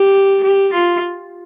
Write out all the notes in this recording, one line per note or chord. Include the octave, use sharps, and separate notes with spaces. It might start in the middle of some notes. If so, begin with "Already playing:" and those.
Already playing: G4
G4
F4